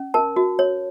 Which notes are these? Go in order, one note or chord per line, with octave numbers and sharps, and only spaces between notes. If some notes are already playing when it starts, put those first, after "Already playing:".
Already playing: C#4
A#4 A5
F#4
C#5